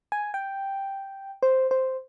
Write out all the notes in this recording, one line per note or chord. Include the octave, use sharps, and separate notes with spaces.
G#5
G5
C5
C5